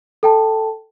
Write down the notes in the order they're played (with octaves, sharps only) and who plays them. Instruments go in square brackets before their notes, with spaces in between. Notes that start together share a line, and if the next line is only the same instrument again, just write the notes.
[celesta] A4 G5 A5